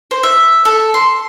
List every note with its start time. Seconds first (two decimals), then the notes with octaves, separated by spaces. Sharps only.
0.11 C5
0.23 E5
0.65 A4
0.94 C6